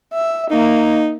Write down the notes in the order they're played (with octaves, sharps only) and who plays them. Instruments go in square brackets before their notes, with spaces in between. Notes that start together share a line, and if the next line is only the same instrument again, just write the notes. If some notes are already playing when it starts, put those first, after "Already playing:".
[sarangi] E5
[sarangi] A#3 [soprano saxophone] D#4